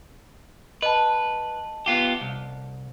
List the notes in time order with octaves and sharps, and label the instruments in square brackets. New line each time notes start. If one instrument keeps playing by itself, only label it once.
[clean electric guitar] B4 [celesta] D#5 A5
[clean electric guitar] B3 F4 G4
C2